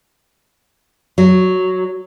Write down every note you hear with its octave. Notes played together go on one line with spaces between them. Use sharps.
F#3